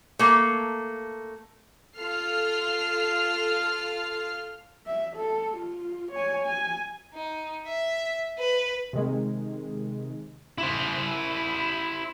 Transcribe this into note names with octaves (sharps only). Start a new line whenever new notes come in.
A3 A#3
F4 A4 F6 C7
E5
A4
F4
C#5 G#5
G#5
D#4
E5
B4
C3 D#3 G#3
E4 C5